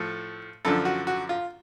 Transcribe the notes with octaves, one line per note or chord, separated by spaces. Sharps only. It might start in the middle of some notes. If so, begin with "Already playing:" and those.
Already playing: A2 F3 A4
F#2 D3 F3 A4
F#4
F#4
F4